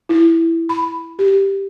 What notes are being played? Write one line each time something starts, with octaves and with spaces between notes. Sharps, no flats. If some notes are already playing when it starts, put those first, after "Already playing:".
E4
B5
G4